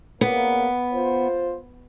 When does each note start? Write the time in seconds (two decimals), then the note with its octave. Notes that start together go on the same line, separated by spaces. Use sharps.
0.21 A#2 C#3 A#3 B3
0.92 F4 C5